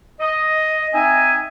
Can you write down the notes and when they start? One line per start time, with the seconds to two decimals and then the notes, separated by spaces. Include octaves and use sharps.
0.20 D#5
0.94 C4 D#4 D#5 E5 G#5